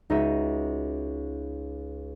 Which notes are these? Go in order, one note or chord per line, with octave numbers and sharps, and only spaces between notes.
C#2 D#4 F#4 E5 D#7